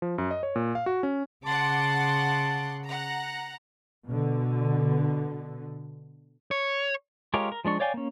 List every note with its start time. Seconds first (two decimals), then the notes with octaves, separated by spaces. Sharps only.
0.02 F3
0.18 F#2
0.31 D#5
0.43 C#5
0.56 A#2
0.75 F5
0.86 F#4
1.03 C#4
1.46 C#3 F#5 A5 C6 D6
2.86 F#5 A#5
4.07 B2 D3
6.51 C#5
7.34 G#3 F4 G4 A#4 C#5
7.52 A#4
7.65 F3 G#3 D4 C#6
7.80 C#5 D5 F5 G5 G#5
7.94 A#3 C#4